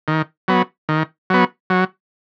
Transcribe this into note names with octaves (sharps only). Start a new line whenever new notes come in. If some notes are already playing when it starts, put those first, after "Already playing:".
D#3
F#3 B3
D#3
F#3 B3
F#3